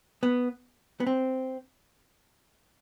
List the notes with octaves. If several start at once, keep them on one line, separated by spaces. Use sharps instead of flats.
B3
B3
C4